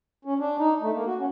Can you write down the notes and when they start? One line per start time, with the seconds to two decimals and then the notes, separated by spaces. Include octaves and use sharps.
0.25 C#4
0.39 D4
0.59 D#4
0.82 A3
0.94 A#3
1.07 F#4
1.19 C#4